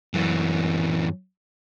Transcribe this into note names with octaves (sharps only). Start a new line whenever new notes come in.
F#2 E3